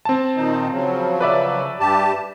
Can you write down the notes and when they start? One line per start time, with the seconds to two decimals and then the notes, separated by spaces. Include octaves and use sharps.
0.05 C4 A5
0.36 A#2 D#3 D#4
0.71 C#3 F3 F#3
1.21 B4 D5 E5
1.80 G2 G4 A5